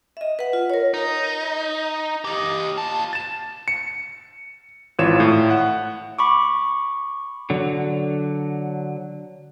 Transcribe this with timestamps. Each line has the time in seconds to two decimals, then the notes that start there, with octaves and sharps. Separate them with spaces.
0.17 D#5 E5
0.39 B4 F#5
0.53 F4
0.70 A#4 C#5
0.94 D#4
2.25 G4 D#5
2.78 A#2 A5
3.13 A6 E7
3.68 C#7
4.99 G#1 E3 F4 C#5 E7
5.20 A2
5.50 F#5
6.19 B5 C#6 D6
7.50 D3 F#3